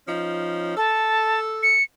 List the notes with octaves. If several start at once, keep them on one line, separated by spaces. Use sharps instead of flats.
F3 C#4 D#4
A4 A5
C#7